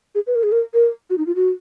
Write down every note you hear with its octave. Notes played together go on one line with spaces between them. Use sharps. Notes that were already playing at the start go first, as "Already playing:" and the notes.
G#4
B4
A#4
G#4
A#4
A#4
F#4
D#4
F4
F#4